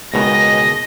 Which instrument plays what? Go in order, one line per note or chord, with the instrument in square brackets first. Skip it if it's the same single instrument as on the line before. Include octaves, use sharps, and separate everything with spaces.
[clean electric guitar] C#2 B2 D#3 [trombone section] G#3 [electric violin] D#5 A#6